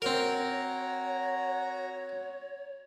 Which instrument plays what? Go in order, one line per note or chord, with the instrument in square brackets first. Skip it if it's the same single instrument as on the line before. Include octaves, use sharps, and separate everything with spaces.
[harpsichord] C4 A#4 [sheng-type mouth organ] F#4 A#5 [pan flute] C#5